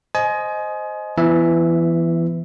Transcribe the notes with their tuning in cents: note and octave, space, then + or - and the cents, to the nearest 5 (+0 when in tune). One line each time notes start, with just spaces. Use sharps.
C5 +0 D#5 +0 G#5 +30
E3 +25 B3 +0 E5 +0